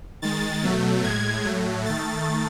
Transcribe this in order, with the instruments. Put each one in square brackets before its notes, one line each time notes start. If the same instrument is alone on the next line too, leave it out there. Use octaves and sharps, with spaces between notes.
[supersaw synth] D#3 G#3 A6
B2 F#3 A3
A2 G#3 G#6
A2 F#3 A3
D#3 A3 A6